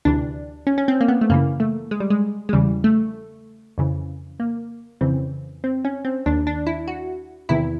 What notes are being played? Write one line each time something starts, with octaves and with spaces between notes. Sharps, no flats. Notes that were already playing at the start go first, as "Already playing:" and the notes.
D2 C3 E3 D4
C#4
C#4
C4
A#3
B3
A3
F#2 C#3 E3 A#3
A3
G#3
G3
G#3
G#3
E2 C#3 E3 G3
A3
F2 C#3 E3
A#3
F2 C#3 E3 C4
C4
C#4
C4
D#2 D#3 D4
D4
E4
F#4
E2 C3 D#3 E4